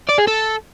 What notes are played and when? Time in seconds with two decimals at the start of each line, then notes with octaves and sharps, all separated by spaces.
0.09 D5
0.18 G#4
0.28 A4